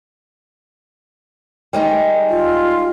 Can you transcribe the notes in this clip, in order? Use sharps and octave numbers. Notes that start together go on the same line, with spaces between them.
G3 G#3 D#4
F4